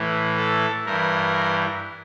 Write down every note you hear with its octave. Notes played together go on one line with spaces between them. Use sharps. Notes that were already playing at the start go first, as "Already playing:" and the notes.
Already playing: A2 E3
A4
G2 E3 A#4